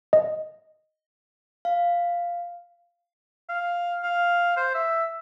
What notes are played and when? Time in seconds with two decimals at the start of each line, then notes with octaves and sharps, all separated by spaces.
0.13 D#5
1.65 F5
3.49 F5
4.03 F5
4.57 C5
4.75 E5